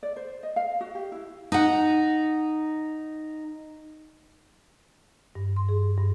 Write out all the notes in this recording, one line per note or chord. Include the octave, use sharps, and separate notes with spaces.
D5
C5
D#5
F5
F#4
G4
E4
D#4 F#5
G2
C6
G#4
G2